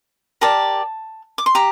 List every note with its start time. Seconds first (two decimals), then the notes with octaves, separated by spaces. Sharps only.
0.41 G4 A#4 D5 A5
1.38 D6
1.46 C6
1.55 G4 A#5